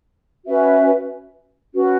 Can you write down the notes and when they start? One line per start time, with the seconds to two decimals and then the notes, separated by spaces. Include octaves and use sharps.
0.46 C#4 F#4 B4 E5
1.74 C#4 F#4 B4